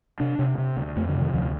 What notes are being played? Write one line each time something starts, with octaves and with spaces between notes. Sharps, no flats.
C3 D4
C3
C3
D2
F2 A3
D3
C3
D#3
D2 F3